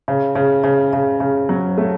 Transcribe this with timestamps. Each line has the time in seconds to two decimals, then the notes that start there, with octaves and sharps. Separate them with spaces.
0.08 C#3
0.35 C#3
0.64 C#3
0.93 C#3
1.20 C#3
1.49 F#3
1.78 A3